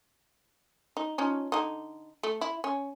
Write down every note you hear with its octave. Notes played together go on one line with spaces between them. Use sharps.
D#4
F3 C#4 D#4
D3 D#4
A3
E4
C#4